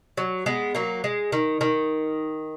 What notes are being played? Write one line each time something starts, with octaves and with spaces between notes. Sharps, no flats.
F#3
G#3 B3
F#3 A#3
G#3
D#3
D#3